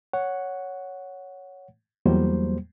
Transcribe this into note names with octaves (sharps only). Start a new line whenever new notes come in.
C#5 F#5
E2 F#3 G3 A#3 C5